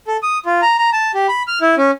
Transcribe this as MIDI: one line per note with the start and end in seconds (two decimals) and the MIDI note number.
0.07 0.17 69
0.23 0.38 87
0.46 0.61 65
0.62 0.77 82
0.78 0.90 82
0.93 1.12 81
1.14 1.27 67
1.28 1.43 83
1.47 1.59 89
1.61 1.75 64
1.78 1.91 61